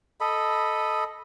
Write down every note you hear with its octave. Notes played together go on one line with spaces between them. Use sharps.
A4 D#5 B5